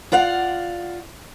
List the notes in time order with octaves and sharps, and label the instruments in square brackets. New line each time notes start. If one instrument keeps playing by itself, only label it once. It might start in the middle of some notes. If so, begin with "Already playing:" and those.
[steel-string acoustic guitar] F4 D5 F5 F#5